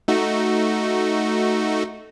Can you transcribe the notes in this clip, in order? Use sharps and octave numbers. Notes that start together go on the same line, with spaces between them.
A3 D#4 F#4